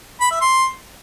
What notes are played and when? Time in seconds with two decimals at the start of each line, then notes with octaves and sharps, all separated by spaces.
0.21 B5
0.31 E5
0.41 C6